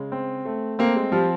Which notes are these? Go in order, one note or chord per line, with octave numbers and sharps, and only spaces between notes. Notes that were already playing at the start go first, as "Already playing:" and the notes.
Already playing: C#3 G#3
C4
A3
A#3 C4
G#3
F3 G3